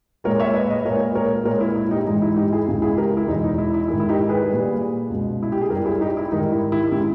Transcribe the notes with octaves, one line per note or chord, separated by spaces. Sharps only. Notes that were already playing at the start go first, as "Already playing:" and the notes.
A#2 G#3 A#4 C#5
C#5 E5
B4 D#5
B4 D#5
A#2 G#3 A#4 C#5
A#4 C#5
A#2 G#3 A#4 C#5
E4
E4
D#4 G4
G#2 E3 G#3 D#4
E4
D#4 G4
E4 G#4
C#2 C#3 G#3
E4 G#4
G4 A#4
E4
E2 B2 G#3 D#4
D#4
E4
E4
G#2 D#3 G#3 E4
E4
D#4 G4
G#4 B4
A#2 G3
C#2 B2 G#3
E4
G4
G#4
G2 G3 G4 A#4
E4 G#4
D#4 G4
E4
G#2 D#3 G3 D#4
E4
E4
G4
C#3 G#3 E4